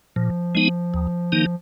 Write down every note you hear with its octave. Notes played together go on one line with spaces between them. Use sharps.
A#2 F3
G#3 B3 D#4
D#2
D#3 A#3 D#4